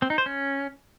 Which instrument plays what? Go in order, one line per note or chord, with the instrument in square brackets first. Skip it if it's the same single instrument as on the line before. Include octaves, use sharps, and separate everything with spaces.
[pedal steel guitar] C4
D#4
C5
C#4